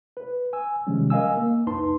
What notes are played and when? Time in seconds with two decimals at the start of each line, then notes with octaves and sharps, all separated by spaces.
0.17 B4
0.53 G#5 E6
0.87 C3 D#3 F3 G3 G#3 C#4
1.10 A#4 D#5 F5 G#5 E6
1.37 A#3
1.67 C2 F2 D#4 B4 A5 C6